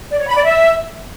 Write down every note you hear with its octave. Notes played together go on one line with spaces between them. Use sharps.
D5
C#5
B5
D5
E5